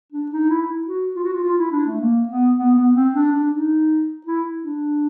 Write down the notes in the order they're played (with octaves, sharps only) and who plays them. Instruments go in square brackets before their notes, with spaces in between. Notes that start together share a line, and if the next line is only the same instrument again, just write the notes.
[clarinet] D4
D#4
E4
F#4
F4
F#4
F4
F4
E4
D4
A3
A#3
B3
B3
B3
C4
D4
D4
D#4
E4
D4